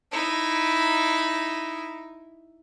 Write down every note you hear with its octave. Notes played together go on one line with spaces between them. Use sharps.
D#4 E4